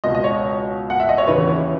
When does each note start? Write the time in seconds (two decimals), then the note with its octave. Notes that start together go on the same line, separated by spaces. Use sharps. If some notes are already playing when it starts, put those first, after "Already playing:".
0.04 C#2 B2 D#5
0.15 D#5
0.24 C#5
0.90 F#5
1.00 E5
1.09 D#5
1.18 C#5
1.27 D#2 C#3 E3 B4
1.48 E4